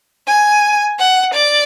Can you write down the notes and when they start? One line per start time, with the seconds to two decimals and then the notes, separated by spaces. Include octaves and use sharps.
0.27 G#5
0.99 F#5
1.34 D5